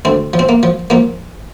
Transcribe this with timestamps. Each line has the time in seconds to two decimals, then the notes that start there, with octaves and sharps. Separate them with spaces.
0.05 D2 C4
0.33 F3
0.39 C4
0.49 A#3
0.63 F3
0.90 F3 A#3